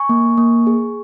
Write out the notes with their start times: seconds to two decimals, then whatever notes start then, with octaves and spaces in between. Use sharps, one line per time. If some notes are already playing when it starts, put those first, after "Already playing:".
Already playing: G#5 C#6
0.09 A#3
0.37 A#3
0.67 G#4